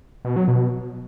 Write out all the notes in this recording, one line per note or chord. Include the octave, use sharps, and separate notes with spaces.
B2
F#3
B2